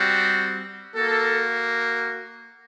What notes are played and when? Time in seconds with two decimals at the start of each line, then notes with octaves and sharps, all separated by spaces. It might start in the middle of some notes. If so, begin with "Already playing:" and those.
Already playing: G3 C4 F#4
0.96 A#3 F#4 A4